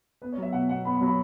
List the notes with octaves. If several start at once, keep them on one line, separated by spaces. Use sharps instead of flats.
B3 B4
C#5
F#3 E5
B2 F#5
B2 F#5
B3 B5
B5
F#3
B5